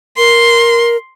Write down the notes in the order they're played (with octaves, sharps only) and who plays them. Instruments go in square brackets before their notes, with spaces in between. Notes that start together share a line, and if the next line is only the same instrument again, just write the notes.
[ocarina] A#4 [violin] C6